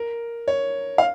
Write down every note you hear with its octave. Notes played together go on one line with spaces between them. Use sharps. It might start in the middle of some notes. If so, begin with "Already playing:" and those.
Already playing: A#4
C#5
F5